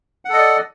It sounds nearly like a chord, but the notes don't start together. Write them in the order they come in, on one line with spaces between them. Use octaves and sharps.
F#5 A4 D#5 D5